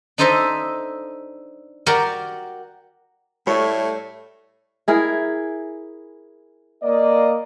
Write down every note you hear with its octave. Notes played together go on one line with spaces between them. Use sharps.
D4 D#4 A4 C5 D#5 E5
F#4 G4 A#4 D5 F#5
A2 G3 A3 C#5
E4 G#4 A#4
A#3 D5 D#5